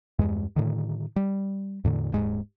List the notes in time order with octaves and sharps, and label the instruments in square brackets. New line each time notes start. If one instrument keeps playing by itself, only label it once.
[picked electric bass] E2 G2 G#3
A2 D3 D#3
G3
E2 A2 D3
D#1 G#2 G#3